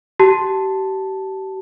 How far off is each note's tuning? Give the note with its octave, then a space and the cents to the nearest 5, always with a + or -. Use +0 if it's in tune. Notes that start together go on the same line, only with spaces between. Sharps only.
G4 -35 A5 +0